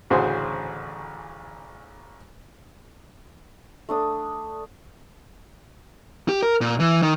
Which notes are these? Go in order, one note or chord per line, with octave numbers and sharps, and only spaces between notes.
A1 D2 C#3 F#4 G#4 C5
A3 D4 D#6
G4
A#4
A#2
E3
D#3